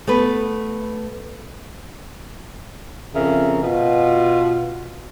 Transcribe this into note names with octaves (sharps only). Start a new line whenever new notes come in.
A3 B3 B4
F2 C#3 A#4 E5
B2 F4